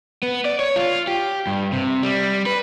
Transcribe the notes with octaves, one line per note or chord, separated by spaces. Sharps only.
B3
D5
C#5
F4
G4
G2
C3
G3
B4